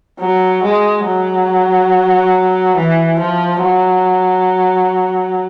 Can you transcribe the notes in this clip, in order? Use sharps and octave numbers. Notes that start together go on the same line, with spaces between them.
F#3
G#3
F#3
E3
F3
F#3